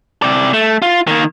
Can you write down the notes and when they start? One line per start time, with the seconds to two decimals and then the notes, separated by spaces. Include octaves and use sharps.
0.22 C3 D5
0.53 A3
0.82 F4
1.07 D#3 A#3